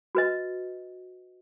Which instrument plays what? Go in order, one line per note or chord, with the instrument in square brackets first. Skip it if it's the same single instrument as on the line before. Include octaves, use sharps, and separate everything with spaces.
[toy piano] F#4 B4 D#5